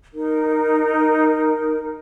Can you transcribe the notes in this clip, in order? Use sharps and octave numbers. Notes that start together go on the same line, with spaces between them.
D#4 A#4